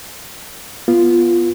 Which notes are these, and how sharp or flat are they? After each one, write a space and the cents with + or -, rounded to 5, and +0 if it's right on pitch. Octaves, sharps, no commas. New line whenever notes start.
B3 -20 F4 -10